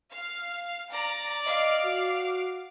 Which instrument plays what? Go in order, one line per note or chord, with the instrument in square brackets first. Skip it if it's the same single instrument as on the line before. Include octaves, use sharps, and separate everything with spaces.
[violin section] F5
[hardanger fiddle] D5 [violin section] A#5
[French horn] D#5 [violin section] F5 D6
[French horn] F#4